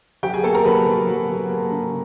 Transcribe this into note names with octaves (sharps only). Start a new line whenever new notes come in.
F#3 G4 G5
G#4 G#5
A#3 A4 A5
A#4 A#5
F#3 B4 B5
F#3
F#3
F#3
A#3
C#3